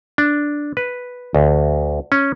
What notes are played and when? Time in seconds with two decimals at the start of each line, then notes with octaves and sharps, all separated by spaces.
0.18 D4
0.77 B4
1.35 D2
2.12 C#4